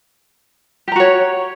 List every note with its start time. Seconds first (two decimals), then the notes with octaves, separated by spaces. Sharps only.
0.88 G4
0.92 A#5
0.96 F#4
1.00 C#5